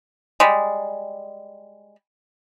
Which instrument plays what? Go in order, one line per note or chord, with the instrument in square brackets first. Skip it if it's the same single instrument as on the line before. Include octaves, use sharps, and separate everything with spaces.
[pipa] G3 G#3